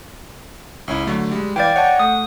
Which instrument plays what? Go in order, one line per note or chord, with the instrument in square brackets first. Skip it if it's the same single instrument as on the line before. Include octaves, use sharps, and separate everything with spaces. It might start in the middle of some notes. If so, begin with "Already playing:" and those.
[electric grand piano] C#2 C#4 E4
D3 F#3 A3
G3 G#3
[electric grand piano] E3 F5 G6 [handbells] D5 G5
[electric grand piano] C#5 D#5 A5 [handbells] F#5
[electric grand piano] A3 [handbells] D#6